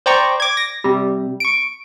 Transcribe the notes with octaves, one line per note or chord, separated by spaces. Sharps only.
C5 D5 G5 A#5 C#6
D6 G#6
A#6
C3 G3
C#6 D7